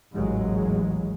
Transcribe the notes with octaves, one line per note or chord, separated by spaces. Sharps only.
A1 D#2 G#2 E3 F#3 G#3